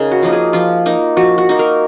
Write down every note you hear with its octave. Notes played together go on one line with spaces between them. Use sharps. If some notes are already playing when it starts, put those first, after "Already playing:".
Already playing: C#3 D#4 G#4 A#4
F#4
F3 A#3 D#4
G#4
F3 F4
A#3 D#4
F3 F#4
F#4
A#3 D#4
A#4